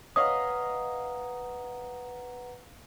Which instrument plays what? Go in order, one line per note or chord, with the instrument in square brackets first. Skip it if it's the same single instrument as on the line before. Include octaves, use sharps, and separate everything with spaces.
[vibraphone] B4 F#5 A#5 [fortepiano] C#5 D#5 F5 [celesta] D#6